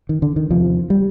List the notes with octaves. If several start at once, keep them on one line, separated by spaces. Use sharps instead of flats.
D#3
D3
D#3
E2 C3 F3
G3